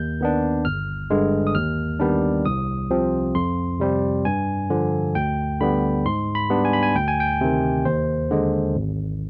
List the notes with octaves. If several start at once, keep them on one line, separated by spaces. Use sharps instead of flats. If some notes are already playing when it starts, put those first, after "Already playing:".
Already playing: D#2 G6
D#3 B3 D4
G1 F6
G2 D3 G#3
D#6
D#2 F6
D#3 G3 B3 D4
C2 D#6
C3 F3 C4
F2 C6
C3 G3 C4
G2 G#5
D3 F3
D2 G5
D3 G3 B3 B5
G#2 C6
B5
G3 B3 D4
G#5
B5
G#5
D2 G5
G#5
G5
C3 D#3
D#2 C5
D3 G#3
G#1